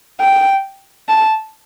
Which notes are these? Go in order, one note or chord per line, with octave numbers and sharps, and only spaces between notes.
G5
A5